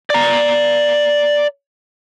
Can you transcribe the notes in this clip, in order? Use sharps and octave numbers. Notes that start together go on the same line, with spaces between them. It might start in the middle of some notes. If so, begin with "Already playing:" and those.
D5 A#5